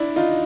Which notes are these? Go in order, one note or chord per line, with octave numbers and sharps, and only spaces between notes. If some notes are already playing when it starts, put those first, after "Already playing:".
Already playing: D4 E4
D#4 F4